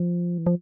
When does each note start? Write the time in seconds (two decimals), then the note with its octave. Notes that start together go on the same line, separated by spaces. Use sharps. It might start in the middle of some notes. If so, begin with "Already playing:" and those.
Already playing: F3
0.38 E3
0.46 F3